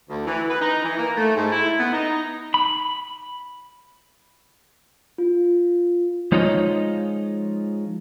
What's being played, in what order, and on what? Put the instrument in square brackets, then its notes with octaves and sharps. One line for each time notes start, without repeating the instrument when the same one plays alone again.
[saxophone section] D2
E3
B4
D#4
E3
A#3
A3
G#2
E4
B3
D#4
[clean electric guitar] B5
[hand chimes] F4
[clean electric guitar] F3 G#3 D#4 F4 C#5 D#5